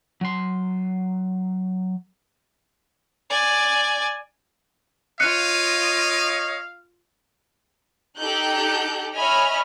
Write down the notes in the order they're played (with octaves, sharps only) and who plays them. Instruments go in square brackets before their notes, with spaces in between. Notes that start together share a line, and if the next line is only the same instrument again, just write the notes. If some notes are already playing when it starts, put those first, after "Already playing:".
[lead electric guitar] F#3 C6
[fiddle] D5 G#5
[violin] F4 D#7 [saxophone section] C#5 D#5 [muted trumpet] F5 [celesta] F#6 C#7
[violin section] D#4 G4 A4 F#6 G6
C#5 D#5 E5 G#5 B5 F6